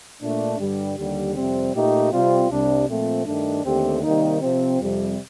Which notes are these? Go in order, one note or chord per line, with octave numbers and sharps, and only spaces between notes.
A#2 A3 D4
G2 D3 G3
D#2 D3 G3
F2 C3 G3 C4
A#2 A3 D#4 G4
C3 G3 C4 F4
C2 C3 G3 D4
A#2 F3 A3 C4
G2 D#3 A3 D4
D#2 D3 A3 C4 G4
C3 D#3 G3 A#3 D#4
C3 F3 C4
F2 C3 G3 C4